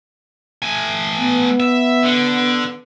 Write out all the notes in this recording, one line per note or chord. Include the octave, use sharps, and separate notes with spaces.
A3 G#5
B3
E5
D3